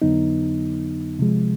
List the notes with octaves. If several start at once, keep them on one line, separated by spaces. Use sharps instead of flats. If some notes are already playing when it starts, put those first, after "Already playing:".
F2 D3 F#3 B3 D#4
C3 F3 G#3